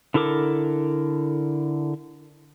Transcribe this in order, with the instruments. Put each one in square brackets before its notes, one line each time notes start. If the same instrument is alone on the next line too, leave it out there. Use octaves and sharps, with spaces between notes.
[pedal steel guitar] D3 E4 A4 A#4 D6